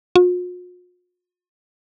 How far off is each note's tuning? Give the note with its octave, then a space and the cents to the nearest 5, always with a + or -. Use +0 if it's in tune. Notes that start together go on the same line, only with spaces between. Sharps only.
F4 +45